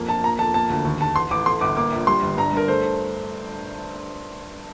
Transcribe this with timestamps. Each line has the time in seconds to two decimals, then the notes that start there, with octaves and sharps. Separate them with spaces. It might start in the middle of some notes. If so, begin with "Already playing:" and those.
Already playing: F2 A#3
0.08 A#1 A5
0.24 A#3 A#5
0.39 F2 A5
0.54 A#3 A5
0.70 D2
0.85 D#2
1.01 D#2 A5
1.16 A1 C6
1.31 A1 D6
1.46 A3 C6
1.61 G1 D6
1.76 A#3 D6
1.92 A#1
2.07 G3 C6
2.22 G1
2.37 G2 A#5
2.53 G2 A#4
2.68 A3 C5